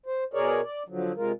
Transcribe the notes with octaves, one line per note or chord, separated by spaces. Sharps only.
C5
B2 G#4 A#4 C#5 D5
D5
D3 F3 F#3
C3 G#3 F4 A#4